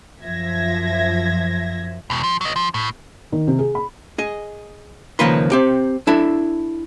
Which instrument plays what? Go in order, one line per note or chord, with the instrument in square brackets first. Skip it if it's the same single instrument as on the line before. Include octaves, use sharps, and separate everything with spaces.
[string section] F#2 F3 E5 G#6 A#6
[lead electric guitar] E2 B2
F3
F#3 D#5
F3
A2
[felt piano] D#3
C3
G#4
B5
[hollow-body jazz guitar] G#4 D#5
C#2 D#3 F3 A#3 B4 C6
C4 G4
D4 E4 A4